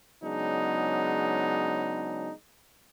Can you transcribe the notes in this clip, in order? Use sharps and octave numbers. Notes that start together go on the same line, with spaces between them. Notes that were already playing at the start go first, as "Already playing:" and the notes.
C#3 F#3 G#3 B3 D4 D#4